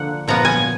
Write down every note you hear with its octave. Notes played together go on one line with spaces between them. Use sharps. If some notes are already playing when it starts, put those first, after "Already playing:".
Already playing: D3 F3 A#3 F#5
A#2 F3 B3 A#5
G#5